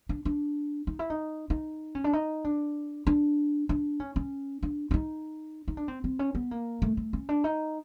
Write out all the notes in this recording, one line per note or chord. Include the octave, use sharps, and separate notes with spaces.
D4
D4
D#4
E4
D#4
D#4
C#4
D4
D#4
D4
D4
D4
C#4
C#4
D4
D4
D#4
D#4
D4
C4
C4
C#4
B3
A#3
A3
A3
C#4
D4
D#4